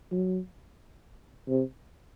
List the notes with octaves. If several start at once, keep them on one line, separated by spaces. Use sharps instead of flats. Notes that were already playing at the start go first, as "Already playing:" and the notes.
F#3
C3